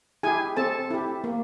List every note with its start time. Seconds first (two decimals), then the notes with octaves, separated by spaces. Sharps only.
0.23 E4 G4 G#4 G#5
0.57 C4 A4 A5
0.91 E4 G4
1.24 A#3